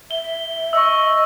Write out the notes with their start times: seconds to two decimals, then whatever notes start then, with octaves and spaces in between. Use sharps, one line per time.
0.11 E5 G7
0.73 D#5 C#6 E6